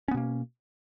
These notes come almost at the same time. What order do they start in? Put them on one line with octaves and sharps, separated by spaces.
C#4 B3 B2 A#3